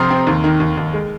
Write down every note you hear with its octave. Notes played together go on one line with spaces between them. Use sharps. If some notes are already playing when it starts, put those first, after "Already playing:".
Already playing: C3 F3 C4 A#5 C6 D#6 F6
C4
D#2
D#3
D#2
D#2
G#3